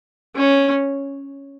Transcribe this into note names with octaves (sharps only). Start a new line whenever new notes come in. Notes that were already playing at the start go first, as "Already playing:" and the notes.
C#4